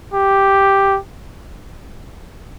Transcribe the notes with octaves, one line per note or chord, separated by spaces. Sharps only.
G4